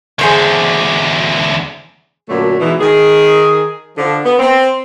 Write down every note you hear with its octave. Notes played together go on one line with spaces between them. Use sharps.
E2 D3 G#4 C5 C#6
F#2 A#2 D3 F#3 A3
G#2 B2 E3
D#3 G#4
D3 F3
B3
C4